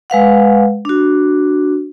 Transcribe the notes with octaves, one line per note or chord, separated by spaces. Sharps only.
G#3 B4 F5 F#5
D4 F#4